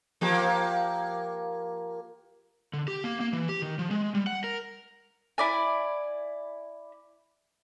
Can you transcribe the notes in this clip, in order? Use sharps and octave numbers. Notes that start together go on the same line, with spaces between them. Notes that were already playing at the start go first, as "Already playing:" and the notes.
F3 A#3 G4
D3
G4
A#3
A#3
E3
G4
D#3
F3
G#3
G3
F#5
A#4
E4 D5 G#5